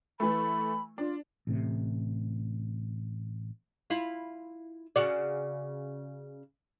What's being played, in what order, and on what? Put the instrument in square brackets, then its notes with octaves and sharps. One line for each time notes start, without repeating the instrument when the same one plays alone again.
[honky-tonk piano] E3 A3 [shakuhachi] B5
[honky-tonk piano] D4 [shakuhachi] F4
[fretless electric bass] A1 A2 C3
[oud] E4 F4
C#3 F#4 D5